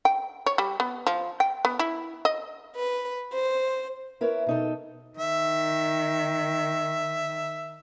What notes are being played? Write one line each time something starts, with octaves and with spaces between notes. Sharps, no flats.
G5
C#5
G3
B3
F3
G5
B3
E4
D#5
B4
C5
E4 A#4 B4 C#5
B2 D#4 A4
D#3 E5